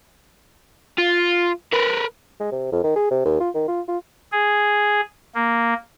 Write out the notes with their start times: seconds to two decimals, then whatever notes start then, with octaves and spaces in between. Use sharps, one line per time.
0.98 F4
1.73 A#4 B4
2.40 G#3
2.52 C3
2.72 F2
2.84 D#3
2.96 G#4
3.11 C3
3.25 D#2
3.40 F4
3.55 D#3
3.68 F4
3.88 F4
4.32 G#4
5.35 A#3